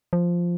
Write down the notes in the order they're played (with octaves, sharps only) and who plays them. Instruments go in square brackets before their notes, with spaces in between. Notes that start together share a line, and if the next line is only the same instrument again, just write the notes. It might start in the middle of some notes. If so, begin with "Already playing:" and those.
[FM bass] F3